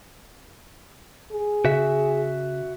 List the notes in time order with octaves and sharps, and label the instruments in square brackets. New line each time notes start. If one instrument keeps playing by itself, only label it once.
[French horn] G#4
[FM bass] C#3 [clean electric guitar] F#4 E5